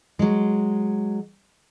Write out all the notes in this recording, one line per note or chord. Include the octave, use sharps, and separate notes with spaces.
F#3 G#3